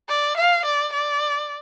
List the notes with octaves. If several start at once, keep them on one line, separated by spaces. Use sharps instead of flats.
D5
F5
D5
D5